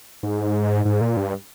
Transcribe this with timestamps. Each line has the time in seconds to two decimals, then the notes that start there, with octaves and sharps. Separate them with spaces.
0.23 G#2
0.85 G#2
1.01 A#2
1.17 G2